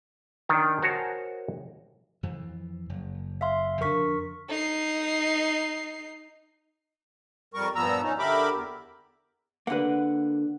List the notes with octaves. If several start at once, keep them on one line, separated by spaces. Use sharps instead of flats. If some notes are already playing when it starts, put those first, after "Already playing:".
D#3 D4
F#4 A#4 C5 C#5 G#5 A5
F2 E3 F3
F#1
E5 F5 C6
F2 D3 D4 A#4 C#6 B6
D#4 C7
F2 G3 A#4 C#6
G2 A#2 F3 B3 A#5 E6
C#4 D#4
D3 G4 A#4 E5 B5 D6
E2
D3 A#3 B4 F#5